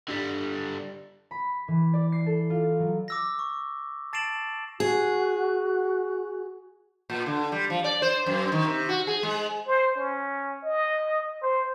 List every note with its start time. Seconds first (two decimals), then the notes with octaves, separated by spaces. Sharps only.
0.09 D3 G3
1.31 B5
1.68 E3
1.93 D5
2.12 C7
2.26 A4
2.50 F4
2.80 F#3
3.08 D6 E6 A#6
3.39 C#6
4.13 A5 A6 C7 D7 E7 F#7
4.80 F#4 G#4
7.10 A#2
7.26 D3
7.52 G3
7.70 F3
7.84 D5
8.02 C5
8.26 F#2
8.52 D#3
8.65 C3
8.89 F#4
9.07 G#4
9.23 G#3
9.67 C5
9.96 C#4
10.63 D#5
11.43 C5